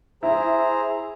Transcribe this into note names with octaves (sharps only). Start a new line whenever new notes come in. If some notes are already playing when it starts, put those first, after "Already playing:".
E4 G#4 C5 A#5